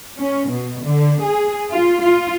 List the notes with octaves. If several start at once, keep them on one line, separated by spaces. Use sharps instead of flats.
C#4
B2
D3
G#4
F4
F4